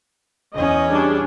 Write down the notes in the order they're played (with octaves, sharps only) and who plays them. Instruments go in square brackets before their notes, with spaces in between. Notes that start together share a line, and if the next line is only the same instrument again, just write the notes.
[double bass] E2 C#4 [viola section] D#5
[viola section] G3 D4 G#4